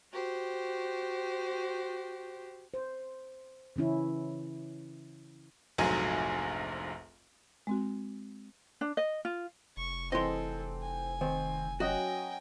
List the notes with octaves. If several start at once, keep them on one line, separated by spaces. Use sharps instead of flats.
F#4 G4 C5
C5
C#3 E3 C#4 E4
F1 A#1 G#2 F#3 G#5
G#3 C4 F#4
D4
D#5
F4
F1 C#6
E3 C4 G#4 A4 D#5 C6
G#5
D#3 C4
F#3 C#4 F#4 D#5 G5 G#5